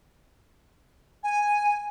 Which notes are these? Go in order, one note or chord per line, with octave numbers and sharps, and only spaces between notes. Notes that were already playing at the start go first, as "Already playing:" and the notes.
G#5